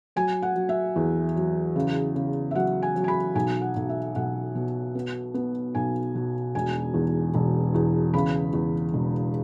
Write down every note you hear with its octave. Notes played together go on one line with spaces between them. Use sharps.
F#3 G#5
F#5
F#3
E5
E2
F#3
C#3
C#3
E5
F#3 F#5
G#5
F#3
G#5
B5
B1 G#5
F#5
B1
E5
B1 F#5
B2
B3
B3
B1 G#5
B2
E1 G#5
E2
E1
E2
C#3 B5
E2
E1